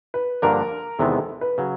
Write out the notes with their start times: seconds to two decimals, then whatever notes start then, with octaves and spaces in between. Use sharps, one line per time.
0.14 B4
0.42 G2 D3 F3 A#3 D4 A#4
0.99 E2 C3 D#3 G#3 B3 A4
1.41 B4
1.58 C#3 F#3